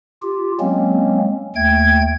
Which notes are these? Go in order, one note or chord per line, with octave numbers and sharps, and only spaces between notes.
F4 G4
F#3 G#3 A#3 C4 C#4
D#2 A3 G5 G#6